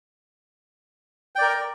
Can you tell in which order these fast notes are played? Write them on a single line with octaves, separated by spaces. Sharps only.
G5 D5 A#4